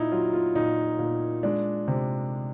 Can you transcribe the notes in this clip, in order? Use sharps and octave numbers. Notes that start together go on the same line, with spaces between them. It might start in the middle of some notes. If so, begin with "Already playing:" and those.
Already playing: A#2 D#4 E4
F#3 F4
F4
A#2 D#4
A#2
G#3 D4
C3